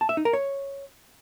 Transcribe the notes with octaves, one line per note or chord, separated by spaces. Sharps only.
A5
E5
D#4
A#4
C#5